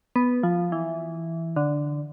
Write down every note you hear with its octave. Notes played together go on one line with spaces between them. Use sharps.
B3
F3
E3
D3